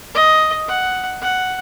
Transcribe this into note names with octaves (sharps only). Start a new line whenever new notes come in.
D#5
F#5
F#5